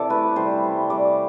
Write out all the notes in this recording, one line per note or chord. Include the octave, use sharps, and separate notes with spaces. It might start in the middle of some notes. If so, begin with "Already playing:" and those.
Already playing: C3 E3 A4 D5
A3 B4
G3 C5
C3
G3 D5